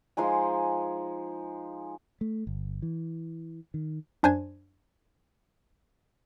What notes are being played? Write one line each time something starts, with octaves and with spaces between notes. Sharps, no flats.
F3 G#3 D#4 G#5
A3
G1
E3
D#3
F#2 D4 C5 G#5 G#6